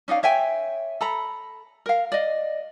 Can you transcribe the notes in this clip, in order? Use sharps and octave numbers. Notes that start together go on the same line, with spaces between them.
C#4 D#4 D5 F5
C#5 E5 G5 G#5
A4 A#5 B5
A#4 F5
D5 D#5